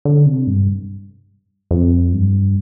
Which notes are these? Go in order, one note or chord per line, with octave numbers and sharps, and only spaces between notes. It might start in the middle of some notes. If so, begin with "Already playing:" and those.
D3
C3
G2
F2
G2